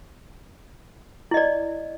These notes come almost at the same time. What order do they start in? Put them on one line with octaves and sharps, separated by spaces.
E4 D#5 D5